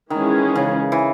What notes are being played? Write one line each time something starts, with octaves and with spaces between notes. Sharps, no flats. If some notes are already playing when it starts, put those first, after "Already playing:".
D#3 E3 G#3 C#4 G#4
C#3
E3